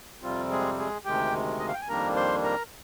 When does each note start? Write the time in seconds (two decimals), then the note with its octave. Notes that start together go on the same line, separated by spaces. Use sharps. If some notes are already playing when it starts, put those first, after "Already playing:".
0.22 F2 C3 G3 C4 F4
0.51 G#3 G#4
0.79 G#3 G#4
1.05 D2 C3 D#3 G#3 G4 G5
1.59 D#5
1.68 F5
1.74 G5
1.81 G#5
1.89 F2 D#3 G3 A#3 D4 A#4 A#5
2.16 C5 C6
2.43 A#4 A#5